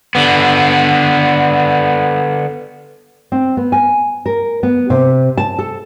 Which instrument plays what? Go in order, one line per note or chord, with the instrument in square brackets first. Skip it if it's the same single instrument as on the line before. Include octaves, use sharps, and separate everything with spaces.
[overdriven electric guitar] D3 B3
[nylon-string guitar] C4
B3
G#5
A#4
B3
C3
A5
A4